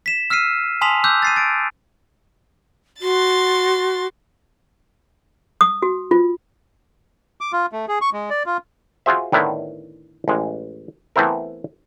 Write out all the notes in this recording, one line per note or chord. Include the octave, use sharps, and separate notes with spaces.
B6 E7
E6 F6 B6 C7 D#7
G#5 A5 C6 D#6 B6 F7
D6 E6 F#6 G6
A6 C7 D#7
A6 D7
F#4 C6 A6
D#6
F#4
F4
D6
F4
A3
G#4
C#6
G#3
D5
F4
F4 F#4 G#4 C5 E5
A2 D3 D#3 B3 E4
A1 G#3
E3 A3 B3 C4 E4 A#4